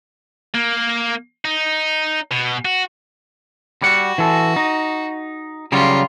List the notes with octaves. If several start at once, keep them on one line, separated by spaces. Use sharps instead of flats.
A#3
D#4
B2
F#4
G3 F#4 F#5
E3 A4
D#4
C#3 F#3 G3 F4